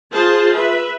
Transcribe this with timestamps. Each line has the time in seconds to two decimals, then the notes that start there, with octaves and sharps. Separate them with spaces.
0.12 F4 G#4 C5 A5
0.54 B4 E5